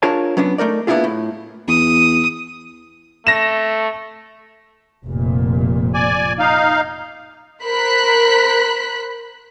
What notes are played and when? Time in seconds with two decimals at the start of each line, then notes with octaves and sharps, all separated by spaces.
0.03 D4 F4 G#4 A#4 C#5 A5
0.37 F#3 B3 C#4 D4
0.58 A3 D#4 A#4 D5
0.87 A#3 B3 D4 E4 F4 G#4
1.04 A2
1.68 E2 D#6
3.27 A3 A#6 E7
5.05 F1 A#2
5.94 D5 G#5
6.39 D#4 F5
7.63 A#4 C5 B5 F#6 B6